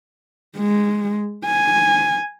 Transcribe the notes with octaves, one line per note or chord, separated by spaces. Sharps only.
G#3
G#5